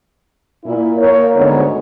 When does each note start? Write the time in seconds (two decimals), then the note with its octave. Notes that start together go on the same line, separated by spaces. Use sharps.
0.65 A#2 E4
0.98 A#3 A#4 C#5
1.36 D2 G#2 D3 B3 C#5